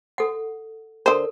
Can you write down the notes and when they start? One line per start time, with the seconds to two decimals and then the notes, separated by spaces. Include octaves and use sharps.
0.18 A4 F#5
1.06 D3 A4 A#4 C5